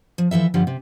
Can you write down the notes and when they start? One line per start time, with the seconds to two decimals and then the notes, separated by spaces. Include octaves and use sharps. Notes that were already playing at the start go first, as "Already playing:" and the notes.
0.18 F3
0.31 E3 F3 A4 E5
0.54 G2 D3 F3 G3
0.67 C3